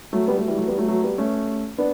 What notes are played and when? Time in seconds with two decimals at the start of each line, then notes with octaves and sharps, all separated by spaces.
0.13 F#3 A3
0.28 G3 B3
0.38 F#3 A3
0.48 E3 G3
0.58 F#3 A3
0.68 G3 B3
0.78 F#3 A3
0.88 F#3 A3
1.03 G3 B3
1.18 A3 C#4
1.78 B3 D4